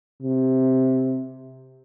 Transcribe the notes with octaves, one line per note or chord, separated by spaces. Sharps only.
C3